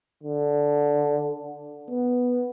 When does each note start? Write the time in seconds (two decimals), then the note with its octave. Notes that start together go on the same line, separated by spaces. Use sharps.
0.23 D3
1.90 B3